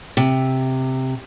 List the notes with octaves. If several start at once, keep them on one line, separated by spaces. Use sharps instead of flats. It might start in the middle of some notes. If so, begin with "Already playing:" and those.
C3